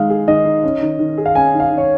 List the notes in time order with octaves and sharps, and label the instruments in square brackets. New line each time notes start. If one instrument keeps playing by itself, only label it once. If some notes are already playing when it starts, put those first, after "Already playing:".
Already playing: [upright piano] D#3 G#3 D#4 [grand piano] F5
[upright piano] G#4
[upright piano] D#3 [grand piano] D#5
[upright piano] D#4
C#4
D#3
D#3
G#4
[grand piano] F5
[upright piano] C#4 [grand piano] G#5
[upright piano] D#3
[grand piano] F5
[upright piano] D#3
[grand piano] C#5